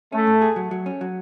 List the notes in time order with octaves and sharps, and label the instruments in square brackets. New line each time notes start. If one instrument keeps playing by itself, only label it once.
[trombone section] A3 [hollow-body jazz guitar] C#4
[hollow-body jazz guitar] A2
G#4
F#3
F#3
C#4
F#3